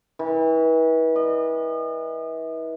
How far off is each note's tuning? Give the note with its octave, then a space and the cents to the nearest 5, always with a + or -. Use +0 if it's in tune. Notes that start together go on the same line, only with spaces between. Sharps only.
E3 -35
D#5 -40